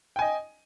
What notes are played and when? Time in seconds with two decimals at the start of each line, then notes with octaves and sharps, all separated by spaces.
0.16 G5
0.19 G#5
0.22 D#5